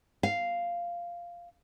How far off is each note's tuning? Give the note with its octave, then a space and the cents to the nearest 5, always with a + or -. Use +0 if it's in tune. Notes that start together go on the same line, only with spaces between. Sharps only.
F5 -5